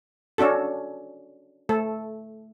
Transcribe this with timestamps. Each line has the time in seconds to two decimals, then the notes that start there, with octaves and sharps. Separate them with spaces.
0.38 C#4 D4 F#4 A4
1.69 A3 A4